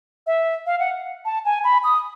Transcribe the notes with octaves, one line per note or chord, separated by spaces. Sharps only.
E5
F5
F#5
A5
G#5
B5
D#6